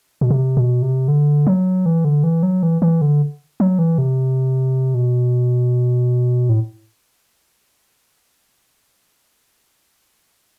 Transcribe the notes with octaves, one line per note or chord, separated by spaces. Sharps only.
B2
C3
B2
C3
D3
F#3
E3
D3
E3
F#3
E3
E3
D3
F#3
E3
C3
B2
A2